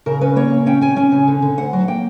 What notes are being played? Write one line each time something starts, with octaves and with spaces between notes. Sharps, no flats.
C#3 A#4
C#4 B4
A#3 C#5
C#3
C#4 G5
C#4 G#5
C#4 G#5
C#3
D3
D3
D2 F#5
F#3
A#3 G5